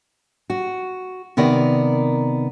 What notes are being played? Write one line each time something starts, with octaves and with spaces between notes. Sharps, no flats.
F#4
C3 D#3 B3 A#4 D5